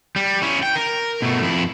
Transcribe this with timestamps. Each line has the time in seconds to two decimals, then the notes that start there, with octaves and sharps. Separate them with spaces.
0.16 G3
0.42 C#4 E4
0.63 G5
0.76 A#4
1.22 B2 A3
1.42 F2 E4